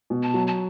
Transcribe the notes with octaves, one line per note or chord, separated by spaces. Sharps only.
B2
A5
F#3
A5